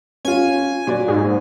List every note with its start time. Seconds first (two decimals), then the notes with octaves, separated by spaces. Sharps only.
0.25 C#4 F4 G#5
0.87 A#2 F#3 D5
1.08 G#2